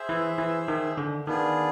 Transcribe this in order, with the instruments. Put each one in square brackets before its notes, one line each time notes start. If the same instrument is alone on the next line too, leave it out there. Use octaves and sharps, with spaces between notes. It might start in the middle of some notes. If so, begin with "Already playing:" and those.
Already playing: [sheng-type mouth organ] G#4 C5 E5
[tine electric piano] E3
E3
D#3
D3
[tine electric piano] D#3 [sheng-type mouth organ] B3 D4 F4 G#4